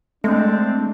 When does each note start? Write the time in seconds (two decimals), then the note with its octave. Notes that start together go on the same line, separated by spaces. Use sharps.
0.24 G#3 A3 C4 D4